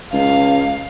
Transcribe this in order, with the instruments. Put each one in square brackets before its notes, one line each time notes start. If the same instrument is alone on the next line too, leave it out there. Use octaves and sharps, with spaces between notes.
[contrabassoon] C#2 [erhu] F5